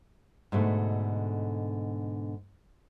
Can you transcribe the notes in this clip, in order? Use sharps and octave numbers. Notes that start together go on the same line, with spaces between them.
G#2 B2 D3 A3